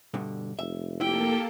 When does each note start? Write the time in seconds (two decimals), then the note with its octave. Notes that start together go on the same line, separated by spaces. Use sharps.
0.14 G2 B2 D3
0.59 F1 E5
1.01 A#3 E4 G4 A4 G5